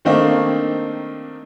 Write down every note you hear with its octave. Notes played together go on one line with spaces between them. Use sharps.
D#3 A3 A#3 C4 D4 D#4